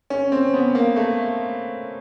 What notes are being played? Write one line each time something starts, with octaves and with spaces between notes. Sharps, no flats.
C#4
C4
B3
A#3
A3